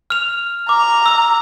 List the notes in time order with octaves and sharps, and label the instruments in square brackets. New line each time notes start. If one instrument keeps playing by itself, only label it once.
[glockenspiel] F6 F7
[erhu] A#5 [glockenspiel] D6
[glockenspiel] E6